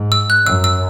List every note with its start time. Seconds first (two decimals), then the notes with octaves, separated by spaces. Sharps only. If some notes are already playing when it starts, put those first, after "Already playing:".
Already playing: G#2
0.12 E6
0.30 F#6
0.46 F#2 E6
0.64 E6